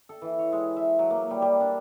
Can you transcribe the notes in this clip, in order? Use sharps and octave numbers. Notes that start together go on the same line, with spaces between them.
A4
E3
C#5
G#3
E5
F#3
A#3
G3
G3
D4